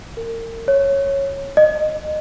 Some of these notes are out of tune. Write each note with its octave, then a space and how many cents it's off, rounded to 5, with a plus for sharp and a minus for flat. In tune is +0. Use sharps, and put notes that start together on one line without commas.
A#4 -35
C#5 -5
D#5 -25